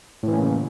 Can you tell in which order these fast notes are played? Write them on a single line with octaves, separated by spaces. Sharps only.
A2 E3 C#4 A#3 C#3